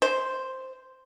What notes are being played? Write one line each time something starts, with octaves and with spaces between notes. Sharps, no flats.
C5